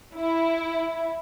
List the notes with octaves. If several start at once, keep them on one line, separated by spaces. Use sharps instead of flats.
E4